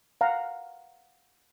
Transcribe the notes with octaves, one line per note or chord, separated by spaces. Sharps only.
F5 F#5 A#5